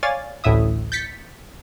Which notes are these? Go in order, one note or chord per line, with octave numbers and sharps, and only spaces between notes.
C#5 D5 F5 G#5 A6
A1 D2 A2 E4 E5 D#6
G6 A6 B6 C#7